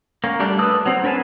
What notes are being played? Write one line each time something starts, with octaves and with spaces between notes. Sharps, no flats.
A#3 C#4
G3 A3 D4 G4
B4 A5 D#6 E6 F#6
F#3 C4
D4 A#4 B4 G#5 A5